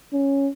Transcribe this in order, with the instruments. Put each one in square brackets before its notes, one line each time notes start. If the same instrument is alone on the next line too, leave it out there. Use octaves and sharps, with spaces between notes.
[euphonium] C#4